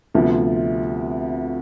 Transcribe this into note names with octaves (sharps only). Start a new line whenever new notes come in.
D2 C3 F3 B3